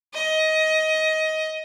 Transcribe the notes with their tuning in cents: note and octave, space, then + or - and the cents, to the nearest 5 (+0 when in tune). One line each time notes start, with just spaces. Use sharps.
D#5 +20